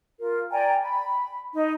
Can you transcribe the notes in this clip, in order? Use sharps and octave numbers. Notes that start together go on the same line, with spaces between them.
F4 A#4
D5 G5 G#5 A#5
B5
D#4